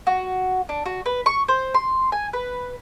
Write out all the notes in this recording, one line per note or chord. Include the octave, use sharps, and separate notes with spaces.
F#4
D4
F#4
B4
C#6
C5
C6
G#5
B4